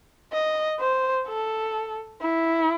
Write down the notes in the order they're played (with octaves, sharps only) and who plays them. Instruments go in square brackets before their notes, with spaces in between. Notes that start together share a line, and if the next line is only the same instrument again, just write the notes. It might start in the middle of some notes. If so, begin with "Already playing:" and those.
[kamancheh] D#5
C5
A4
E4